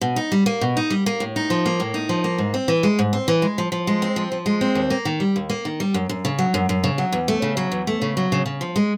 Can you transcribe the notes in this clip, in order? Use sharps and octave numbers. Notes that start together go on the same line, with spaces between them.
B2
D#4
G3
A#3
B2
D#4
G3
A#3
A2
D#4
F3
A#3
A2
D#4
F3
A#3
G#2
C4
E3
G#3
G#2
C4
E3
G#3
F3
F3
G#3
C4
F3
F3
G#3
C4
D#2
A#3
D#3
G3
D#2
A#3
D#3
G3
F#2
F#2
C#3
F#3
F#2
F#2
C#3
F#3
E2
A3
C#3
F#3
E2
A3
C#3
F#3
C#3
C#3
F3
G#3